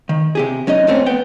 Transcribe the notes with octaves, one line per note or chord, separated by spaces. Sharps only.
D#3
C3 G4 G#4
F#3 C#4 D#4 D#5
F2 A#2 A3 C4 C#4
B3 G5